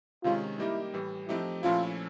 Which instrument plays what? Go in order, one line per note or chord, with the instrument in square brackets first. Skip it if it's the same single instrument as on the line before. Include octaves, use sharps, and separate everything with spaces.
[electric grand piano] C3 D#3 G#3 C#4 [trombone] F4
[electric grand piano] G3 A#3 D#4 G4 A#4 [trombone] E4
[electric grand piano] A2 E3 G3
[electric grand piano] F3 A3 C4 D#4 G4 [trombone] E4
[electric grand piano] A#2 F3 A3 C#4 E4 [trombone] F4